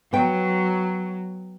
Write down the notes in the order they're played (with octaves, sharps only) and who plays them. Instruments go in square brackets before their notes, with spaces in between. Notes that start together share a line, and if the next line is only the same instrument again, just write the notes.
[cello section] F#3 [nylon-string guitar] B3 G5